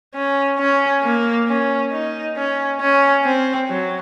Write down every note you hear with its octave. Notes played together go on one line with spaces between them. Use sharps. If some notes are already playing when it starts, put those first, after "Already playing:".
C#4
C#4
A#3
C#4
D#4
C#4
C#4
C4
F#3